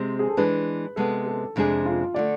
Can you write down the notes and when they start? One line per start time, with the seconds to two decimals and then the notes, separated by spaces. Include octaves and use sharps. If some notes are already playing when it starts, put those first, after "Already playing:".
Already playing: C3 G#3 C4 C5
0.19 G#4
0.29 A4
0.37 E3 G#3 D4 B4
0.96 C3 G#3 B3 A4
1.26 A4
1.56 F2 C3 G#3 D4 G#4
1.85 F4
2.14 D3 A3 D5